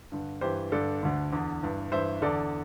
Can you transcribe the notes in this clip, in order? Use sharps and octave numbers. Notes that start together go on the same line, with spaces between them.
G2 D3
G2 E3 G4 C5
G2 D3 A4 D5
D2 D3
E2 D3
G2 E3
G2 E3 C5 E5
E2 D3 A4 D5